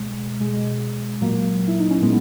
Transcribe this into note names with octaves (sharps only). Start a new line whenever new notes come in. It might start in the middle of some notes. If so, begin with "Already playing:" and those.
Already playing: B2 G#3
B2 G#3
A#2 F#3 A#3
E4
D#4
C#4
A#2 G#3 B3